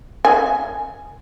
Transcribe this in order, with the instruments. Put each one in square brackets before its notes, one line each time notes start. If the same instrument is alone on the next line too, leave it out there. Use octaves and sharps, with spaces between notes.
[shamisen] G#5